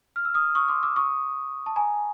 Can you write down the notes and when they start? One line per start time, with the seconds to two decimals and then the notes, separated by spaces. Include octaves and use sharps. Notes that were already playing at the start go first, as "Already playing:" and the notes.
0.16 F6
0.25 E6
0.34 D#6 F6
0.55 C#6 D#6
0.68 C6 D6
0.83 D6 E6
0.96 C#6 D#6
1.66 A5
1.76 G#5 A#5